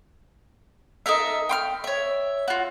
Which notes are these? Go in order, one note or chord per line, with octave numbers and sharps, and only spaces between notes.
D#4 A4 A#4 E5
G5 C6 F6
C#5 E5
F4 F#4